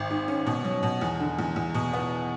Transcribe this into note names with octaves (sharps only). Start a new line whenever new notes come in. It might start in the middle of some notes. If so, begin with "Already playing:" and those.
Already playing: G#1
G#2
C#4
B2
F#3
B2
E2
D3
E2
E2
B2
B3